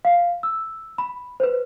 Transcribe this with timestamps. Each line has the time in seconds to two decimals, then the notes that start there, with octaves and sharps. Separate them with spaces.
0.05 F5
0.43 E6
0.98 B5
1.40 B4 C5